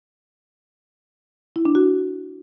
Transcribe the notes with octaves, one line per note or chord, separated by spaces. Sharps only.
E4
D4
F#4